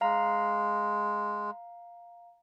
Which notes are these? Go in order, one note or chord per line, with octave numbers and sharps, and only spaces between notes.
G#3 F5 A#5